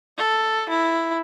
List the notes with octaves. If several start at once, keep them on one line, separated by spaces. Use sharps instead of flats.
A4
E4